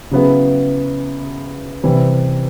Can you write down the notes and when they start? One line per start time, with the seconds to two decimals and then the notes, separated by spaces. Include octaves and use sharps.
0.11 C#3 F#3 B3 E4 G#4
1.83 C3 E3 G3 C4